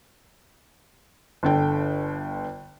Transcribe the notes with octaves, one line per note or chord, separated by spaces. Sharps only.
G1 D3 G5